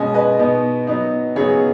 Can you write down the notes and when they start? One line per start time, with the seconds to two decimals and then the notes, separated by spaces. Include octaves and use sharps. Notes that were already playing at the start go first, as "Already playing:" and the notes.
Already playing: B2 G#3 C#4 D#5 G#5
0.14 B4 D#5
0.39 B2 B3 D#4
0.87 F#3 B3 D#4
1.36 C#3 F#3 B3 D#4 G#4 C#5